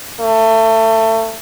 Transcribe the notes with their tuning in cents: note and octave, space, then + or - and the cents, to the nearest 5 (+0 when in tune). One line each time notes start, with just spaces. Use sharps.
A3 +25